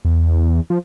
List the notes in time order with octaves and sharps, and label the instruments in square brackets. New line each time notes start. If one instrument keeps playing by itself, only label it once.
[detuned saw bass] E2
F3